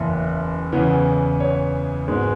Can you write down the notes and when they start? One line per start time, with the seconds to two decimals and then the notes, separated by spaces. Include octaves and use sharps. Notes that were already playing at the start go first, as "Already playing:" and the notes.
Already playing: F#1 E2 E3 B3 B4 E5
0.72 E2 C#3 E3 B3
1.40 C#5
2.08 G#1 G#2 G#3 B3